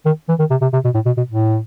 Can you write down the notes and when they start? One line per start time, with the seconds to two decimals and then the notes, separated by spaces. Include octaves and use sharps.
0.06 D#3
0.29 E3
0.39 D#3
0.50 C3
0.62 C3
0.73 C3
0.84 B2
0.94 A2
1.06 B2
1.17 B2
1.28 A2